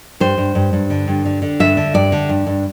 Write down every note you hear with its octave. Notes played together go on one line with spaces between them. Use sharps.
G2 C5
G2
G2
G2
D3
G2
D3
D3
G2 E5
D3
G2 D5
D3
G2
G2